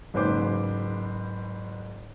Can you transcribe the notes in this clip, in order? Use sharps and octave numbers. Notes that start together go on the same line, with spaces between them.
F#1 G#2 B4 C5 D6